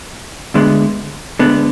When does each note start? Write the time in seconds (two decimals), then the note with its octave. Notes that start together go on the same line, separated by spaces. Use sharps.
0.54 D2 D3 G#3 B3
1.39 D2 D3 G#3 B3